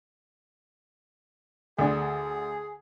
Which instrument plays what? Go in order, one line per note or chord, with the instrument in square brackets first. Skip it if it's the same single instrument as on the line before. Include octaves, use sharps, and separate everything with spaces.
[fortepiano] D2 D4 [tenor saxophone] G#4